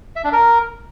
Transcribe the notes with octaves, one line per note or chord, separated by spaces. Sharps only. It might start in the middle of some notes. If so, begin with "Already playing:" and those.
E5
D4
A#4